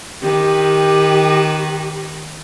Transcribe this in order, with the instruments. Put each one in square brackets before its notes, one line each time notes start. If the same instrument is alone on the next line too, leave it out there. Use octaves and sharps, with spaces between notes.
[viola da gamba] D#3 B4 [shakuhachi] G4